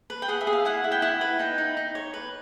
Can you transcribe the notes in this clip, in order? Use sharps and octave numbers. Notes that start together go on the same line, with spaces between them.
B4
G5
G#4 F#5
E5
G#4
F5
E4 F#5
E4
G5
E4 F#5
B4
D#4 G5
D#4
D#4
C#5
B4